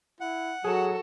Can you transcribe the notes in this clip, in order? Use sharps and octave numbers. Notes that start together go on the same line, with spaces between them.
E4 F#5
F#3 F#4 G#4 A4